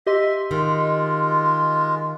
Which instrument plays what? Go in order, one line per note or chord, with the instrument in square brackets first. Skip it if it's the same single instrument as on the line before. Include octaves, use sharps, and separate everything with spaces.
[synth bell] G4 D#5 C6 [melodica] E5
[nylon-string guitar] D#3 [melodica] G#3 F4